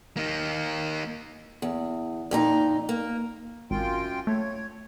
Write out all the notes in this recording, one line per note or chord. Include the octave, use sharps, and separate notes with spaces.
A#3 D#4
E2
F2 A#2 D#4
A#3
G#1 F#2 F4 G5
A3 C#5